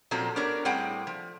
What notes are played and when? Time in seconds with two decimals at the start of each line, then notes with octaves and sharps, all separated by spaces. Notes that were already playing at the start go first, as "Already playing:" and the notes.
0.11 A#2 F3 F#3 C4 A4
0.36 B3 D4 G4 A#4 C#5
0.65 A2 G3 C4 G#4 F#5 G5
1.07 F3